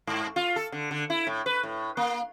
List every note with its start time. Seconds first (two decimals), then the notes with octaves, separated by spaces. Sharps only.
0.07 G#2
0.36 F4
0.56 A4
0.72 D3
0.91 D3
1.10 E4
1.27 A2
1.46 B4
1.63 A2
1.97 A#3